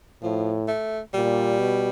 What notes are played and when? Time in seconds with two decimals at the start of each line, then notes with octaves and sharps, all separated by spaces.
0.22 A2 F3
0.68 A3
1.14 A#2 G3
1.59 B2